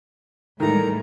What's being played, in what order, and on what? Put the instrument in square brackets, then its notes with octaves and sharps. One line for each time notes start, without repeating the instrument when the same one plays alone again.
[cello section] A2 G3 G#3 [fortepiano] D#3 E3 [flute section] A4 A#4 A#5